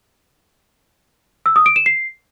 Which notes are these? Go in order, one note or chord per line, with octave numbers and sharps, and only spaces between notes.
E6
D#6
D7
E7
C7